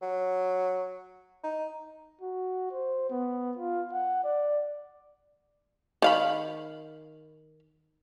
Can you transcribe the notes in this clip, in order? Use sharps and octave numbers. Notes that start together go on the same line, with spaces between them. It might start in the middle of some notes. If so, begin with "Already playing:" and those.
F#3
D#4
F#4
C5
B3
F4
F#5
D5
D#3 F5 B5